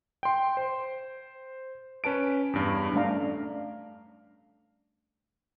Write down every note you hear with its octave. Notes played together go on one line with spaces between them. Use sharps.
G5 C6
C5
C#4 B4 A5 D7
E2 G2
G3 A3 C#4 D4 F5 A#5